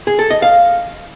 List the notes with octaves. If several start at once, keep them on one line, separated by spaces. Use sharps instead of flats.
G#4
A4
D#5
F5